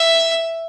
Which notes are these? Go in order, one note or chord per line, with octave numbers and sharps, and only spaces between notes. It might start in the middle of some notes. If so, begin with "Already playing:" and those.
Already playing: E5